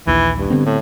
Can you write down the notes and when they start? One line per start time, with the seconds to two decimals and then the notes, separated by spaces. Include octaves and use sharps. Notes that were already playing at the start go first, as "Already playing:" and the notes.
0.07 A#1 D#2 E3
0.37 G2
0.50 D3 B3 C4
0.66 A2